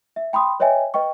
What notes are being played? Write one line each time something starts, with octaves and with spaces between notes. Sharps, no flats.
E5
G5 B5 C6 D#6
B4 C#5 D#5 E5 G5 G#5
B4 D#5 G5 C#6